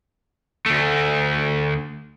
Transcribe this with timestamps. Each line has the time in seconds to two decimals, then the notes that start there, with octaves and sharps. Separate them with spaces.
0.66 D2 A3